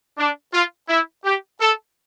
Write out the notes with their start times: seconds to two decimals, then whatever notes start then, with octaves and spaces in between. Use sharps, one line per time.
0.18 D4
0.53 F4
0.89 E4
1.25 G4
1.61 A4